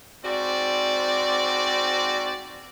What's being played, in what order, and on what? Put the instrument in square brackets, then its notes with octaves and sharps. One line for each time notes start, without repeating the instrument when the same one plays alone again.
[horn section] G#2 C4 F#4 D5